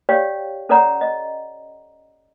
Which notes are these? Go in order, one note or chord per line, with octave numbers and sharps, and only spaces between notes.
G4 C#5 D5 F5 G5
C#4 A4 C#5 D5 F#5 A#5
D#5